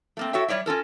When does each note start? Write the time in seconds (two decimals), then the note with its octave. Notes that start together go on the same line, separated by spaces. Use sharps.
0.17 A3 A#3 C4
0.33 F#4 A4 C#5 E5 G5
0.48 G3 G#3 C#5 D5 E5
0.66 C#4 F4 A4 A#4